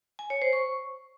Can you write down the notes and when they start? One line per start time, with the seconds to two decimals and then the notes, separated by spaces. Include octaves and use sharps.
0.19 G#5
0.30 C#5
0.42 C5
0.53 C#6